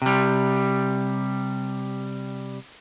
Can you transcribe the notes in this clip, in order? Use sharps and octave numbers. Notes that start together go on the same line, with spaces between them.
C3 G3